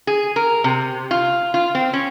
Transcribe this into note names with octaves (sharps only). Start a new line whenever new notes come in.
G#4
A#4
C3
F4
F4
C4
C#4